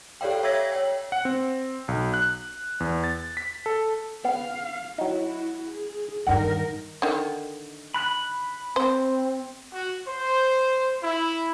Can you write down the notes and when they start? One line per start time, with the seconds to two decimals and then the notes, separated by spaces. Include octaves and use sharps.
0.21 G4 A4 C#5 D5 F5 G5
0.43 C#5 E5 E6 G#6 A#6 B6
0.72 C#5 G5
1.12 F#5
1.25 C4
1.88 B1
2.14 F#6
2.80 E2
3.04 A6
3.37 B6
3.66 A4
4.25 B3 F5
4.98 F#3 D#4 E4 F#4
5.67 G#4
6.27 G2 D3 D#3 D#4 A#4 F#5
7.02 D3 D#3
7.94 B5 F#6
8.76 C4 C5
9.72 F#4
10.07 C5
11.03 E4